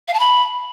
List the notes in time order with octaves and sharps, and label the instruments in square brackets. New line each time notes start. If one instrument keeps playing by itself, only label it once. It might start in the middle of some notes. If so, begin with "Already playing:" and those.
[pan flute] F5
A5
B5